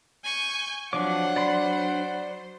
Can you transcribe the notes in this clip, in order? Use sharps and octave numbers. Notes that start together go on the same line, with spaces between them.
G#5 C#6 G6
F3 F#3 D4 C5 C#5 F#5 D6
D5 B5 C6